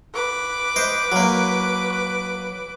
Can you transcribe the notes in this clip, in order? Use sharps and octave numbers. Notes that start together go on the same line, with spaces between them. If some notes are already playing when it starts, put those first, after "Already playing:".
B4 D6
C5 D#5
F#3 A#3